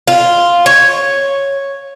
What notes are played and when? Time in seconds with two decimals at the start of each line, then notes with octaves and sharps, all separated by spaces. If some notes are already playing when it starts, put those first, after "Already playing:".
0.08 F4
0.66 C#5